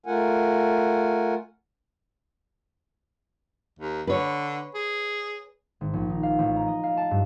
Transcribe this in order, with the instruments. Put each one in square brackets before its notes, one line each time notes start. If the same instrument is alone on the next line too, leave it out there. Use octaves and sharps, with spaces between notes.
[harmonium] A3 F4 A#4 F#5 G#5
[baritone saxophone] D#2
[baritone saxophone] D3 [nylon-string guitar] B4 C#5
[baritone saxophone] G#4
[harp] G#1
A#1
D#4
F5
A1
A#5
D#5
F5
A5
G2